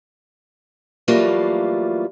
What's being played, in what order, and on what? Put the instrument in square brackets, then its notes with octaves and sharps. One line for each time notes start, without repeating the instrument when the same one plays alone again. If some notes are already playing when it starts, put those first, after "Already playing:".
[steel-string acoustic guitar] E3 F#3 G3 A3 A#3 F4